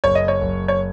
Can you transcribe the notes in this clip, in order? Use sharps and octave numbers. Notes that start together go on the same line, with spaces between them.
F#1 C#5
D#5
C#5
F#1
C#5